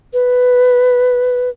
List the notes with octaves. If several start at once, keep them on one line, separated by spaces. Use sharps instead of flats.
B4